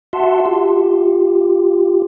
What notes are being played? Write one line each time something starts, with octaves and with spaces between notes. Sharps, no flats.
F#4 E5 F#5 A5 C6
F4 G4